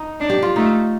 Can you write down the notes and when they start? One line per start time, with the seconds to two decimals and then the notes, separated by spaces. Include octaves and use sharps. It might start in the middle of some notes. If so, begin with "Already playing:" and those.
Already playing: D#4
0.20 D4
0.30 G4
0.42 F4
0.56 A3 D#4